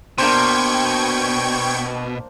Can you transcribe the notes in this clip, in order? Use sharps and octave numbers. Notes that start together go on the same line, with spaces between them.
B2 A#3 D4 C5 G5 C#6 G#6